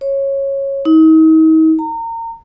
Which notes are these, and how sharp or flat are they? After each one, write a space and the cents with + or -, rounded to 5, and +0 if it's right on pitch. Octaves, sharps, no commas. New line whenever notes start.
C#5 -15
D#4 +40
A#5 -30